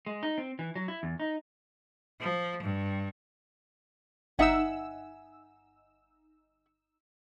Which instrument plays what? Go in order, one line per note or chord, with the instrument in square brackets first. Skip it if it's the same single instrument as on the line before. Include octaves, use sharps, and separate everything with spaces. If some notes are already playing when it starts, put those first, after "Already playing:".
[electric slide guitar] G#3
D#4
C4
E3
F#3
E4
E2
D#4
[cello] F3
G2
[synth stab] G1 D#4 E6 [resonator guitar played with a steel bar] E5 F#5 G#5